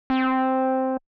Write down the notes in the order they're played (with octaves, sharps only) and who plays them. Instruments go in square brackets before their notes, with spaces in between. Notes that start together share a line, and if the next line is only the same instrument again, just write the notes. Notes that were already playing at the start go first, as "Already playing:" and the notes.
[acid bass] C4